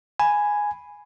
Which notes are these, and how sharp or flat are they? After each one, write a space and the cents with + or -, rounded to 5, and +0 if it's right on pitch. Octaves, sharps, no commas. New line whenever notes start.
G#5 +0 B5 +0